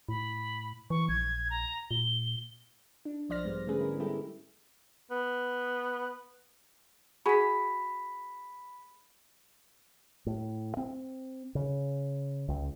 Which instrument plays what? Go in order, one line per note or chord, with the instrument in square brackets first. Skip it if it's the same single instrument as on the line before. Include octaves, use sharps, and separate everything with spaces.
[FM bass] A2 [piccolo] B5
[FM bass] E3 [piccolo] C#6
[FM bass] A#1 [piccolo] G#6
[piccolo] A#5
[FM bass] A#2 [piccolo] G7
[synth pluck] D4
B1 F3 C5 D5 F6 A#6
G#2 G3 G#3 B3
D3 A3 C#4 G#4 B4
E4 A#4
G3 G#3 B3 E4 G4 A4
[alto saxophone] B3
[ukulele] F#4 G#4 [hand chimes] B5 B6
[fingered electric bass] A2
C4
C#3
C#2